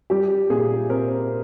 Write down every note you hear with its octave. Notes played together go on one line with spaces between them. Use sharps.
G3 G4
A#2 G#4
C4 A#4